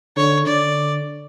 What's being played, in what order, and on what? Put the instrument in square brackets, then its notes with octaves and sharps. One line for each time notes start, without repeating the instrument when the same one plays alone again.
[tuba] D3 [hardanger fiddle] C#5
[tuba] D3 [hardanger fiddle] D5